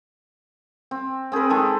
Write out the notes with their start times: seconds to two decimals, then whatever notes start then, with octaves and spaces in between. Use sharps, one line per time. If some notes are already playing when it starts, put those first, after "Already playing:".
0.91 C4
1.32 C4 G#4 A#4 B4
1.50 D#3 G#3 A4